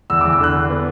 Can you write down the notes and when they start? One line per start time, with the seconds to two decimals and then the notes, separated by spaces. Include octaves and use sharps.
0.10 E2 E6
0.21 D6
0.25 E2
0.33 E6
0.39 D3 F#6
0.55 D3
0.70 B3